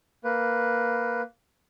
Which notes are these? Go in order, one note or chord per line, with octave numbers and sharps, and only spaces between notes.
A#3 B4